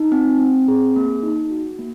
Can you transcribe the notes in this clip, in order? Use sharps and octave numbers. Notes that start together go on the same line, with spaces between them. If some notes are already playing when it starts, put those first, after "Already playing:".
Already playing: D#4
C4
C4
G#4
A#3
D#4
F#4
A#3